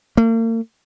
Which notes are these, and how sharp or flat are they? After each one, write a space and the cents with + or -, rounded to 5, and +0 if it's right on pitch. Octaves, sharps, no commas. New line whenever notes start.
A#3 -45